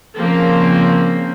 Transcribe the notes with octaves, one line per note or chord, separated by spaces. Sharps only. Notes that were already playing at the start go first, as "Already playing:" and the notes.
C#3 F3 A#3 C4